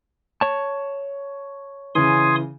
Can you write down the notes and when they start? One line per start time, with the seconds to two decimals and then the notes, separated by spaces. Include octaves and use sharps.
0.41 C#5 A5
1.95 C#3 E3 G#5 C6 D#6